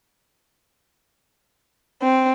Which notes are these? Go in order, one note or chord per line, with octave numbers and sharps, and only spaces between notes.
C4